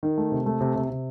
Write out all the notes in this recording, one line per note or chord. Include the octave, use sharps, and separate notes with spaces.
D#3
A3
C3
A3
C3
C3
C3